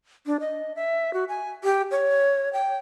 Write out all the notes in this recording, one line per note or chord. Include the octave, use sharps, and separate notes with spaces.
D4
D#5
E5
F#4
G#5
G4
C#5
G5